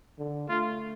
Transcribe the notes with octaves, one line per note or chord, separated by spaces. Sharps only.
D3
A3 F4